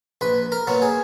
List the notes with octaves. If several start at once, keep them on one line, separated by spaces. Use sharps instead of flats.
A#1 B4
A#4
A#2 F#3 B3
G#4